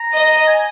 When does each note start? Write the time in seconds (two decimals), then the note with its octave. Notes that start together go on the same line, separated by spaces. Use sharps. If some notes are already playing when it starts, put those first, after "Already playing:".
Already playing: A#5
0.15 D#5
0.47 G#5